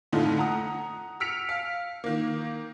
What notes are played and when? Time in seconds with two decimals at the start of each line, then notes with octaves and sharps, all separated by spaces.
0.12 F2 A2 D3 A3 D#4 F4
0.37 F#5 A#5 D#6
1.20 E6 F6 B6 C#7 D7 F7
1.49 F5
2.04 D#3 A#3